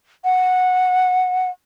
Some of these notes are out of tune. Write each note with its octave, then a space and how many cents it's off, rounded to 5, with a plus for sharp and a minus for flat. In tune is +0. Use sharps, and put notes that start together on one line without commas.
F#5 -10